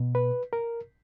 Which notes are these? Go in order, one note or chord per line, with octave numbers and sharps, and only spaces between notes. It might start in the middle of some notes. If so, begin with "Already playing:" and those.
Already playing: B2
B4
A#4